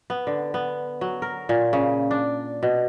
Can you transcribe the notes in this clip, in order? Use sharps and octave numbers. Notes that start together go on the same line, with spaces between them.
B3
D3
B3
F#3
A#4
A#2
C#3
D4
B2